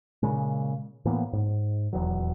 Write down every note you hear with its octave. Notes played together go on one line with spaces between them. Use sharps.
A#2 C#3 G#3
A2 E3 A#3 B3
G#2
D#1 E2 F#3